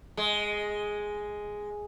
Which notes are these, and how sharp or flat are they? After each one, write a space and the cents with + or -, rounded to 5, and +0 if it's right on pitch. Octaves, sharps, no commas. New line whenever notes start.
G#3 +0